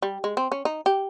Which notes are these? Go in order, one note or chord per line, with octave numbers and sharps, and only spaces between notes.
G3
G#3
C4
C#4
D#4
G4